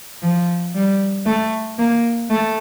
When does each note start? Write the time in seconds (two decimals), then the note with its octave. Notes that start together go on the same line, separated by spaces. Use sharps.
0.22 F3
0.75 G3
1.26 A3
1.79 A#3
2.30 A3